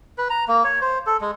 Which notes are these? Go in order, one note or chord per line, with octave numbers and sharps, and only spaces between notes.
B4
A#5
A#3
C#5
C5
A4
G#3